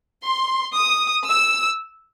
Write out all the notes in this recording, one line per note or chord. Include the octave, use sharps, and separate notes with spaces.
C6
D#6
E6